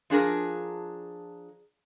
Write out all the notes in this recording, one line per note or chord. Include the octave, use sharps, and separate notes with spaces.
F3 D4 G#4 A#4